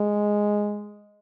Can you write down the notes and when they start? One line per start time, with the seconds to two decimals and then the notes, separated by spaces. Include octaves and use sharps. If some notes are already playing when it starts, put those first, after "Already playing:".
Already playing: G#3